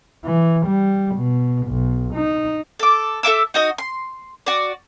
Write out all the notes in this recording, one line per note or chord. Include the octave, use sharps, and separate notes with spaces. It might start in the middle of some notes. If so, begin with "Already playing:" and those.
E3
G3
B2
B1
D#4
A4 D6
A4 E5 D6 E6
D#4 F#4 D#5
C6
F#4 D5